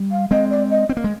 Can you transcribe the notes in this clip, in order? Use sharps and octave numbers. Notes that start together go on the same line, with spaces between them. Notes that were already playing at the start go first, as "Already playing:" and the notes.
Already playing: G3
F5
G#3 C4 D#5
D5
D#5
C4
A#3
G#3